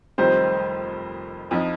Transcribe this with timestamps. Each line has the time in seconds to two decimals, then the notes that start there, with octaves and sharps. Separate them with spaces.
0.18 F1 F2 D#3 G3 C5
1.51 F2 F3 D#4